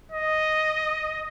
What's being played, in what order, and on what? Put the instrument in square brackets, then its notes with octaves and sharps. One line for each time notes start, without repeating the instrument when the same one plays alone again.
[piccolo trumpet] D#5